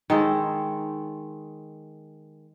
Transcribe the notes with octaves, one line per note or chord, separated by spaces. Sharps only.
D#3 G#3 A4 C5